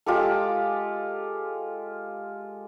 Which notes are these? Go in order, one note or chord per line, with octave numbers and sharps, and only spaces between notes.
G#3 F4 G4 A4